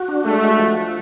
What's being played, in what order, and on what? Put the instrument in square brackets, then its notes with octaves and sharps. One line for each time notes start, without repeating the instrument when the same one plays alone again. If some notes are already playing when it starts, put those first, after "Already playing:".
Already playing: [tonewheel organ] F#4
D4
[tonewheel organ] G#3 [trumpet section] A3
[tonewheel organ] F#4
F3